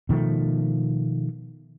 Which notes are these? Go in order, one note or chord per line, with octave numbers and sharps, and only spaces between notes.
B2 D#3 F3 A3